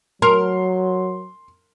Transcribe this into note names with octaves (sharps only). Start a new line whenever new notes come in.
F#3 A#4 C6